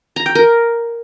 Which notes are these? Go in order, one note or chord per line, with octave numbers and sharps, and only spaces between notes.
A#5
G5
A#4